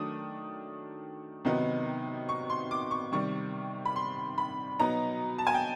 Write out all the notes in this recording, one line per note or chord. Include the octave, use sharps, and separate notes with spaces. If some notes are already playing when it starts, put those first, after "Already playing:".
Already playing: D#3 F#3 A3 D4 D#6
C3 D#3 F#3 B3 D#4
C#6
C6
D6
C#6
C3 D#3 G3 C#6
B5
C6
B5
B2 F#3 B3 D#4 A#5
A5
G#5
G5